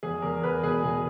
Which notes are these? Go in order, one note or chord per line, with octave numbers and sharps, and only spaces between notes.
E2 G#4
E2 A#4
E2 B4
B2 G#4
B2 G#4